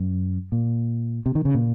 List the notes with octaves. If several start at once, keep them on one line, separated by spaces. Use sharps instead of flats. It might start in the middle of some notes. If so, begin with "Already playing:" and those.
Already playing: F#2
A#2
C3
D#3
C#3
A#2